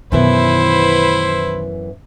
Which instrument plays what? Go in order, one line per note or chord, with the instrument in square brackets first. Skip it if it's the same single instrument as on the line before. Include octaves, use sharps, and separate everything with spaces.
[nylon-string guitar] F#2 E3 B3 [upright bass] B2 D#3 [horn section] E4 B4 C5